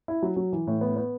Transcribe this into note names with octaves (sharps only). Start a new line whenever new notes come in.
E4
F#3
F#3
E3
A2
B3
B3